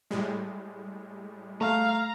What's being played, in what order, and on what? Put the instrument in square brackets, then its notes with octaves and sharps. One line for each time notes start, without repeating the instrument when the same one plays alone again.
[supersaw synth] A2 G3 G#3
[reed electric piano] A3 [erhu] F5 [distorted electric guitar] A#5